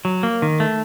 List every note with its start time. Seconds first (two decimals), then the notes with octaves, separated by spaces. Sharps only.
0.05 F#3
0.23 A#3
0.42 D#3
0.60 A3